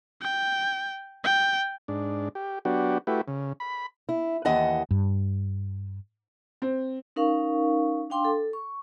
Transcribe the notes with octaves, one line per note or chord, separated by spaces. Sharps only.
G5
G5
G#2 D4
G4
F#3 B3 D4 F#4 G4
A3 E4 F#4 G4 B4
C#3
B5
E4
D#2 E3 D#5 F#5 A5
G2
C4
C#4 D#4 A#4 F5 C#6
D4 F5 G5 C6 D6
A4
C#6